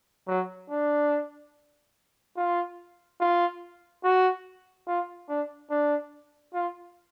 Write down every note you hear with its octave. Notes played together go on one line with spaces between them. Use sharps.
F#3
D4
F4
F4
F#4
F4
D4
D4
F4